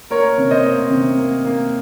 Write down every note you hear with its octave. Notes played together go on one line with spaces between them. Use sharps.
A#3 A#4 C#5
C3
C5 D#5
A#3
C3
A#3
A#3